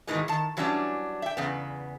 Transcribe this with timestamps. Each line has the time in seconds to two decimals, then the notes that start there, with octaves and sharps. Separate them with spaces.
0.07 G#2 B2 D#3 E3 G#3
0.28 D#3 A5
0.57 E3 F#3 G3 C#4 D4
1.22 E5 G5
1.37 E2 C#3 B3